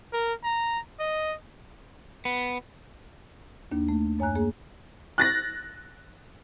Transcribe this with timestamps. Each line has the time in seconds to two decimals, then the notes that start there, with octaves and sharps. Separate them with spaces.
0.13 A#4
0.44 A#5
0.99 D#5
2.25 B3
3.72 D#2 A#3 D4
3.89 A3
4.19 F#2 C#5 G#5 A#5 F#6
4.35 A#3 G#4
5.18 F#6 A6 A#6